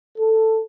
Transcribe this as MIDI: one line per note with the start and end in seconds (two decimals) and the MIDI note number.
0.18 0.58 69